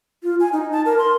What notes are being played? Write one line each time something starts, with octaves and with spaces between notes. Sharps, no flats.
F4
G#5
D#4
A5
A#4
C6